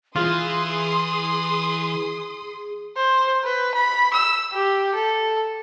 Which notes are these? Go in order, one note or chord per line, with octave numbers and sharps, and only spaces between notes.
E3 F4 G#4 C6 D#6
C5
B4
B5
E6
G4
A4